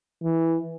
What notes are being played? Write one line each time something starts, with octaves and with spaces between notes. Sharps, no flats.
E3